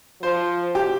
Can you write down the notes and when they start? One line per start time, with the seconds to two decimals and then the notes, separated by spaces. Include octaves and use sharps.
0.22 F3 C5
0.75 G4